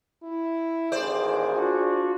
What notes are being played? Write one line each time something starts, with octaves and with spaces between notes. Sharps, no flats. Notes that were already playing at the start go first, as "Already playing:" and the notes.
E4
A1 D#2 G#4 C5 D5
D4 F4 F#4